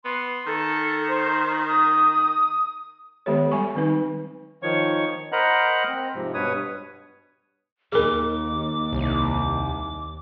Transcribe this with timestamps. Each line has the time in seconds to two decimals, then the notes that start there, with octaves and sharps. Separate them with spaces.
0.05 B3 C6
0.46 D#3 A4
1.09 C5
1.68 D#6
3.26 D#3 G#3 B3 G4 A4 C#5
3.51 F#3 G3 G#5 C#6
3.76 D#3 C4 D#4 B4
4.63 D#3 F3 C#5 C#6
5.32 A#4 C5 D#5 F#5 A#5 B5
5.89 C4
6.15 G#2 C3 F3
6.34 G2 B2 B4 C#5 D#6
7.92 D#2 G#4 A#4 D6
8.92 C2